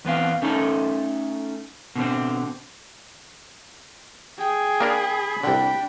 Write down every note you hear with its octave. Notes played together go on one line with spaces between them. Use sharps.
E2 B3 C4 F5
A3 C#4 D#4 A4
B2 D3 C4
G#4 G5
A#3 D4 A#4 B5
C2 D3 D4 G5